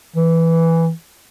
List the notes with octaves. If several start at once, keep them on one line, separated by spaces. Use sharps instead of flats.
E3